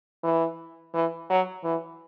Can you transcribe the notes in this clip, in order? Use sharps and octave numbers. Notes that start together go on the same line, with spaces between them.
E3
E3
F#3
E3